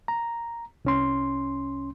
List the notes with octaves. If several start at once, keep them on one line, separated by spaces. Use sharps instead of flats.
A#5
C2 C#4 C6